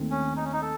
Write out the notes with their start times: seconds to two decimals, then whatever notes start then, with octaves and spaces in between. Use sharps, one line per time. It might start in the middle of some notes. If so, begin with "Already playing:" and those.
Already playing: D#2 D#3 A3 C4
0.11 C#4
0.36 D#4
0.44 C#4
0.53 D#4
0.62 A4